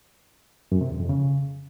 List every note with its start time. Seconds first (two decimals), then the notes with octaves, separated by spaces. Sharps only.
0.72 F#2
0.81 C3
0.90 E2
1.00 F2
1.09 C#3